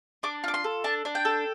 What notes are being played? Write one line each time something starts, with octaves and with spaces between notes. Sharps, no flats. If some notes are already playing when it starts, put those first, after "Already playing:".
D4 D6
F4 D6
C6
A4
D4 A5
D4
G5
A4